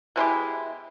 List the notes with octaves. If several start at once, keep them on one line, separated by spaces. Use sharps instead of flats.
B2 G#3 E4 G4